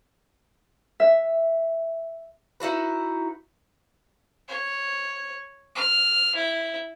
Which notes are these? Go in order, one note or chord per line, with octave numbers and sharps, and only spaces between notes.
E5
D#4 E4 F#4 B4
C#5
F6
E4